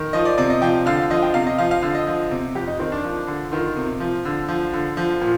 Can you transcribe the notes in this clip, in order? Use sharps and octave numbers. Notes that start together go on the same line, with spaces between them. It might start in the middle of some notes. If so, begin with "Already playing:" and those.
Already playing: D#3
F3 D#5
D5
C3 D5
D#5
F3 G5
D3 F5
F3 D#5
G5
C3 F5
D#5
F3 F5
F5
D3 F5
D#5
F3
C3
F2 G4
D#4
D#3 C4
D4
F3
D3
D#3 F4
C3
F3
D3
F3
D3
F3
A#2